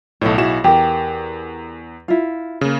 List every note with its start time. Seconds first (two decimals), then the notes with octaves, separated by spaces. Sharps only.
0.21 B1 A2 A4 C#5 D#5
0.38 B1 E4 F#4 G#4 E7
0.64 E2 G4 A#4
2.08 E4 F4
2.61 C#3 A#3